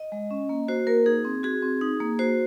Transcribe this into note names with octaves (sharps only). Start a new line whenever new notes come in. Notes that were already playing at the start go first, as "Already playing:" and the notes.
Already playing: D#5
G#3
C#4
A#3
F#4 C5
A#3 A#4
D#4 G#4
C4
F#4 G#4
C4
D#4
A#3
F#4 C5